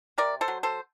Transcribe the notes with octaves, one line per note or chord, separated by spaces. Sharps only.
C3 A#4 D5
A4 C5
F#3
A4 C5